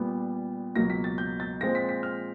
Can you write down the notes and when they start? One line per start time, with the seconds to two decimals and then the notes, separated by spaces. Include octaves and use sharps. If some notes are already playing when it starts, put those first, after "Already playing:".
Already playing: A#2 G3 B3
0.76 C#2 B2 F#3 A#3 A#6
0.90 B6
1.04 A6
1.18 G6
1.40 A6
1.61 A#2 F3 G#3 C4 A#6
1.75 B6
1.89 B6
2.03 F6